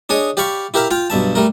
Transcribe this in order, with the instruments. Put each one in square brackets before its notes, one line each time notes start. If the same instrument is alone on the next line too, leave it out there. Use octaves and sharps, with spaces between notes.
[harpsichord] D4 G#4 C#5 D#5
G4 D5 F5 B5 C#6
E4 G4 A#4 E5 F5
F4 F5 G5
B1 G2 E5 A5
G3 A3 A#4